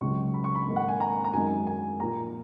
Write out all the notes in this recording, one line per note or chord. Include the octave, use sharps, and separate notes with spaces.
C#2 C#3 F#3 C#6
B5
C#6
B5
G#2 D#3 A#3
F#5
G#5
A#5
A#5
F#2 D#3 G#3 G#5
G#5
A#2 F3 A#3 A#5